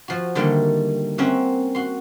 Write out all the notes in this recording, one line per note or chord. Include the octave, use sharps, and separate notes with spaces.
F3 F#4
D3 D#3 G3 A3 A#3
C4 C#4 A#4 E5 F#5
F#4 C6